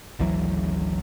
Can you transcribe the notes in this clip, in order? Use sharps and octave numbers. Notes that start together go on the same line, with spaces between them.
G#1 D2 E3 F#3